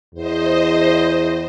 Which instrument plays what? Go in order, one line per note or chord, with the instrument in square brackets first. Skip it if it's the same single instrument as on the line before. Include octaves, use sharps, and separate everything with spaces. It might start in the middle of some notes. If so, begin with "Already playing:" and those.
[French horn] E2 [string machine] C5 D#5